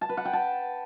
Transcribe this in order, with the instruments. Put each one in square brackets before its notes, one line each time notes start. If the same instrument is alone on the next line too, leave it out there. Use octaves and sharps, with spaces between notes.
[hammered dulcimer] A5
B4
F#5
G5
A5